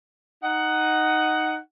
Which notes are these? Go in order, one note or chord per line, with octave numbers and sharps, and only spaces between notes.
D#4 F#5